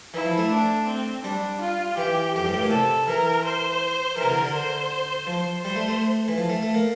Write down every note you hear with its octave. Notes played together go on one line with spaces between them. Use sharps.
E3 E4
F3
A3
D4
C4
G3 D4
F4
E3 G4
F2 G4
G2
A2
A#2
C3 A4
E3 A#4
C5
E3 A#4
C3
D3
D3
C5
F3 C5
G3 C5
A3
A3
E3
F3
A3
A3
A#3